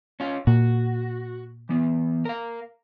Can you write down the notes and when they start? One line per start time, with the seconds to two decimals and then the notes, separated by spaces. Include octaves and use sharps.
0.20 C#4 F4
0.47 A#2 F#4
1.69 E3 B3
2.25 A#4 F5